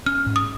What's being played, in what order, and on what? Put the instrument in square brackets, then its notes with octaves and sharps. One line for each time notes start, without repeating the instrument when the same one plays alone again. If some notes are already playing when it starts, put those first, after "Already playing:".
[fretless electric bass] C#4 [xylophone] F6
[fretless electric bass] G#2
[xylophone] D#6